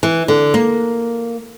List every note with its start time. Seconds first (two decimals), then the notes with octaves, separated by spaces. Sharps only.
0.03 E3
0.28 D3
0.54 A#3